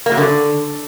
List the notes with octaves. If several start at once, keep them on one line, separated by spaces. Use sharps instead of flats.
A#3
F#3
D3